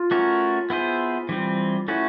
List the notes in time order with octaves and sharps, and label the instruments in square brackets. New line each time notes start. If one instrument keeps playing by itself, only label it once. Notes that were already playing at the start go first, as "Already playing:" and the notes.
Already playing: [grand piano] F4
[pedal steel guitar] A3 C#4 F#4 A#4
B3 E4 G#4 C5
E3 G3 C4
[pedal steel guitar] A3 C#4 F#4 B4 [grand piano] E4